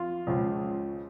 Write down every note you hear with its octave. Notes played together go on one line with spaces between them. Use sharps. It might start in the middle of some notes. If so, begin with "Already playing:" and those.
Already playing: F2 F4
C#2 C#3 F3